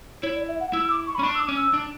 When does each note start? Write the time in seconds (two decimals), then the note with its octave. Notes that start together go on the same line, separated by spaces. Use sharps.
0.23 E4 C#5
0.36 D5
0.48 E5
0.60 F#5
0.73 E4 E6
0.83 E6
0.90 D6
1.07 C#6
1.15 B5
1.19 C#4
1.23 D4 C#6
1.35 E6
1.40 D6
1.48 C#4
1.57 E6
1.73 D4